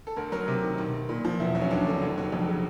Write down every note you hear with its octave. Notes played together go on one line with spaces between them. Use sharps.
A4
D2 A#4
F#3 A#4
C3
D#3
B1
B1
A#2
F3
E1 E4
F#3
C#4
D#2 D4
D3
F1
F#3
F2
C#3